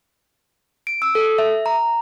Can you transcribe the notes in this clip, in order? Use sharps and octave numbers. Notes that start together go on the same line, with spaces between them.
D7
E6
A4
E5
A#5